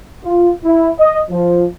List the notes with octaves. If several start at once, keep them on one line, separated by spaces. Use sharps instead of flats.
F4
E4
D#5
F3